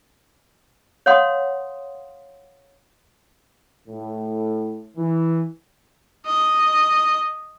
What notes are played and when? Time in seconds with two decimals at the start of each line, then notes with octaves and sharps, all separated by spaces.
1.06 C#5 F5 F#5 C6 D#6
3.88 A2
4.96 E3
6.26 D#5